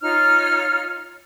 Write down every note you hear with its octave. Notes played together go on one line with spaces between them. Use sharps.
D#4 F4 C#5 F6